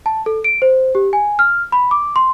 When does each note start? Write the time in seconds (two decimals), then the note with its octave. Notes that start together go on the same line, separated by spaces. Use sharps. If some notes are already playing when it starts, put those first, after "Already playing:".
0.06 A5
0.26 A4
0.44 D7
0.62 C5
0.95 G4
1.13 G#5
1.39 F6
1.72 B5
1.91 D6
2.16 C6